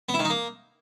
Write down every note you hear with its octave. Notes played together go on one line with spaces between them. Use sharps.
B3
E4
D#3
D#4
A#3